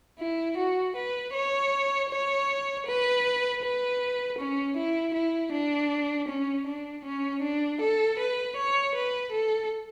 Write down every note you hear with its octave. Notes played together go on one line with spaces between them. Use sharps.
E4
F#4
B4
C#5
C#5
B4
B4
C#4
E4
E4
D4
C#4
D4
C#4
D4
A4
B4
C#5
B4
A4